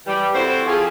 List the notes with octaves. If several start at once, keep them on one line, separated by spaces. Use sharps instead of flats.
E3 G3
C4 E4 F#4 A4 C5
F3 G4 G#4